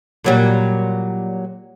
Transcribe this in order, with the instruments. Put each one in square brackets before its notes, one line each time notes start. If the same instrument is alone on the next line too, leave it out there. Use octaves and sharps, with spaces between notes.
[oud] A#2 F#3 G3